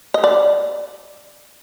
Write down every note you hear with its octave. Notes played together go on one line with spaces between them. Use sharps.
D#5
D5